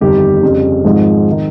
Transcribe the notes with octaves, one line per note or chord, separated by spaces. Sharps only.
G1 F2 D#3 G3 G4
F2 C#3 G3
G#1 G#2 F3 G#3
D#3